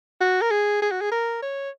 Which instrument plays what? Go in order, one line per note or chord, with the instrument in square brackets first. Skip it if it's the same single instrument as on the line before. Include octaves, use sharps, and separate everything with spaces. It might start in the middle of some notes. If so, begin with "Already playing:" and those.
[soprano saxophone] F#4
A#4
G#4
G#4
F#4
G#4
A#4
C#5